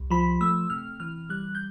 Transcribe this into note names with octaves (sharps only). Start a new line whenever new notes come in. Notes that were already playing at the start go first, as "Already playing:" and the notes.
Already playing: C2
F3 B5
A3 E6
C3 F6
E3 F6
G3 F#6
G6